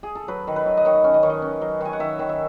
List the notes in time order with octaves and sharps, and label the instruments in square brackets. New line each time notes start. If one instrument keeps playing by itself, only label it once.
[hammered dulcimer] G#4
A4
F#3 B4
D#3
B4
F#3
D#5
D#3 C#5
C#4
D#5
D#3 C#5
D#5
C#4
F#3
D#3 G#5
F#5
D#3 E5
D#3
E5